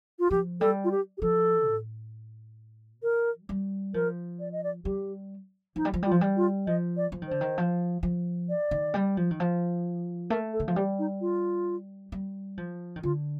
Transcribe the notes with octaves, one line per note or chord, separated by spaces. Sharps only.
F4
F3 G4
G3 A4
F4
G4
G4
F3 A4
A2
D#3 A#4
A3
G3
F3 A#4
D5
D#5
D5
G3 G4
F3 D#4
G3
F3
G3 F4
F3
G3
F4
F3 D#5
D5
F3
D#3
D3 C5
D#3
F3
F3
D5
D#3
G3
F3
D#3
F3
A3 A#4
A4
D#3
F3
G3 G4
D#4
F4
G3
F3
D#3
D3 F4